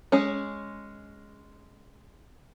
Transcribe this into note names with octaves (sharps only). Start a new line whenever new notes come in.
G#3 C#4